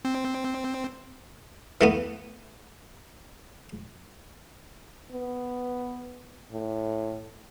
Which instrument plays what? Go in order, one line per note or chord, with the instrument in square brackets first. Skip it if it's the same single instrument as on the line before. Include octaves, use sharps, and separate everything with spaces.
[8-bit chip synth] C4
[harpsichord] E3 A3 B3
[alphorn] B3
A2